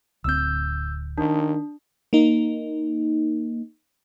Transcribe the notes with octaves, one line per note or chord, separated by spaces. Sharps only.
D1 D2 C4 E6 G6
D#3 D4
A#3 D#4